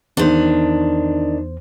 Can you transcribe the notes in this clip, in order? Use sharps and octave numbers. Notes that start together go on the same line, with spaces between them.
E2 D#3 D4 C5